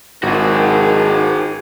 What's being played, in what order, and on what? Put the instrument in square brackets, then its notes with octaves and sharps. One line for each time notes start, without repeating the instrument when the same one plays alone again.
[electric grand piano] G#1 [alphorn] D#3 [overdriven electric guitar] F#4 G#4
[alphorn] G#2